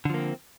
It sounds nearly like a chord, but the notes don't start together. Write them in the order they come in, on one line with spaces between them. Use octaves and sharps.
D3 F3 A#3 C4